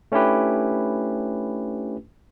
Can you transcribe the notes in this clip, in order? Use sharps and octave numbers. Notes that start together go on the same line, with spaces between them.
A3 C#4 D4 E4 G4 B4